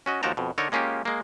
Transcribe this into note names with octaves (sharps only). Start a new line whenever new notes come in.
C#4 F#4 D#5
D#2 F3 F#4 G5 A5 A#5
F2 B2
D3 D#4 A4 A#4 C#5
G#3 A#3 C#4 F4 G4
G#3 A#3